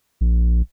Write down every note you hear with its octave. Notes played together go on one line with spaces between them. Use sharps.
A#1